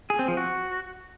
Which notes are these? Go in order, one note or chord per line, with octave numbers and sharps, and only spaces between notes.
G#4
C4
F3
F#4